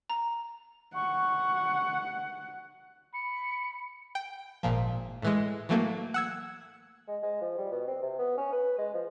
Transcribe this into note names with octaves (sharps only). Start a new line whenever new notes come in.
A#5
F#5 C#6
B5 C#7
G5
G#1 A#2 F3
A2 E3 G#3
E3 F#3 A3 A#3
F#5 E6 G#6
G#3
G#3
F3
G3
B2
C4
C3
B3
C#4
B4
G#3
F3